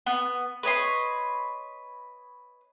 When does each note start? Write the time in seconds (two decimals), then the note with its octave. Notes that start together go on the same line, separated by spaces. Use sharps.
0.06 B3
0.63 B4 C#5 D#5 C6